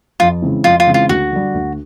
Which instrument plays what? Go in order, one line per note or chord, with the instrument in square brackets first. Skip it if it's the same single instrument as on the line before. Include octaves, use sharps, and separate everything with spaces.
[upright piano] F2 [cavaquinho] F4
[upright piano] C#3 E3 G#3 C4
[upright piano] F2 [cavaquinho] F4
[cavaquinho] F4
[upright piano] C#3 E3 G#3 C4
[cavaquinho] F4
[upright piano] D2 [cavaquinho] F#4
[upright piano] D3 G3
D2